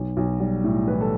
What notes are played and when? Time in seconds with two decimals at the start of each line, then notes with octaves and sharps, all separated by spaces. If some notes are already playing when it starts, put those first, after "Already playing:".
Already playing: B1
0.17 B1
0.40 G3
0.64 A2
0.87 E3 B4
1.01 A4